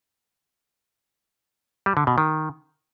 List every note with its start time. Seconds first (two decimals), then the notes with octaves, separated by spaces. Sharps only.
1.86 G3
1.97 D3
2.07 B2
2.18 D#3